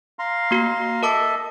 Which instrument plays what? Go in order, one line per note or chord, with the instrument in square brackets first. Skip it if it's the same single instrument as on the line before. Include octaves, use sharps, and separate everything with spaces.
[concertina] F5 A#5 C6
[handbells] A#3 F#4
[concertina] A4 D#5 E5 [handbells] A#4 A5 D6